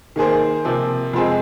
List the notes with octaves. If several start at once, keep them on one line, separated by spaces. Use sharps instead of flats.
D#3 A#3 G#4 C5
C3 F3 A#3
F2 F3 G#3 C4 G#4